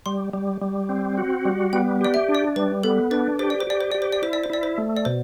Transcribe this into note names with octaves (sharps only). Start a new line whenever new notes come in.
G3 C6
G3
G3
C4
F#4
G3
B3 G5
G4 D5
E5
D4
D5
G3 B4
B3 A4
D4 B4
G4 C5
D5
C5
G4 D5
C5
G4 D5
C5
D5
E4 C5
D5
C5
E4 D5
C5
A3
D5
B2 C5